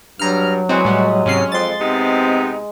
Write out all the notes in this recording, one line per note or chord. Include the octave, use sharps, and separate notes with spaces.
G2 F#3 A#5 F6
E3 G#3 C4 F#4 D#5
A2 G3
G#2 C3 C#4 C7
F2 C6 A6
C3 B3 C4 D#4